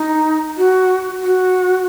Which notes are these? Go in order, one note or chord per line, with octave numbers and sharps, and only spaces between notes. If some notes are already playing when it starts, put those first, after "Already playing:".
Already playing: D#4
F#4
F#4